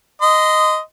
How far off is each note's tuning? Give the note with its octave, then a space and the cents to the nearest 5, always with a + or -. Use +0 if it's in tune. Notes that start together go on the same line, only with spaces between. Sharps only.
D#5 +0 C6 -30